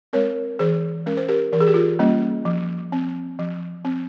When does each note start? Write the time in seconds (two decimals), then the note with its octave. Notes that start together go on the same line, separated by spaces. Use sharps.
0.13 G#3 C4 A#4 C#5
0.59 E3 G#4 C5
1.06 G#3 C#4 A#4
1.17 C5
1.28 G4 A#4
1.52 E3 A#4
1.60 G#4
1.67 G4
1.74 F4 G#4
1.99 G3 A#3 C#4
2.45 F3
2.92 C4
3.39 F3
3.85 C4